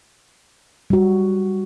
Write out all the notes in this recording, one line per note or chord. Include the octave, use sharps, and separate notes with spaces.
G3 F#4